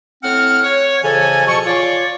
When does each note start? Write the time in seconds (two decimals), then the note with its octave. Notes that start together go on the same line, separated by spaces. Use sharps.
0.24 A2 C4 F#5 F6
0.64 C#5
1.03 F2 C#3 E3 A4 G#5
1.47 F2 B2 F3 C#6
1.65 F4 C#5 D5